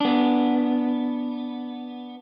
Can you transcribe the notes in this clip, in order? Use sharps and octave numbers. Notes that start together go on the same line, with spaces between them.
B3 D4